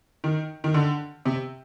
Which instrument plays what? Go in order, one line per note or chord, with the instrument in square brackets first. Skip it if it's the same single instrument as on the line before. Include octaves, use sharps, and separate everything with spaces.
[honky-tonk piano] D#3
D#3
D3
C3